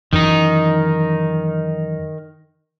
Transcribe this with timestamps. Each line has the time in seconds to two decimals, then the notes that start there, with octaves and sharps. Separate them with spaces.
0.13 F#2 D#3 E3 D#4